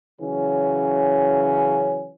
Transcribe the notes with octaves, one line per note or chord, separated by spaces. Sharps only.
C#3 E3 F#3 C#4